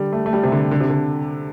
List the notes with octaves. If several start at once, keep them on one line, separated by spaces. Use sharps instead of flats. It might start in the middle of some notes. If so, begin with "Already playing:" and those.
Already playing: D3 G3
A3
A3
G3
C3
D3
D3
C3
D3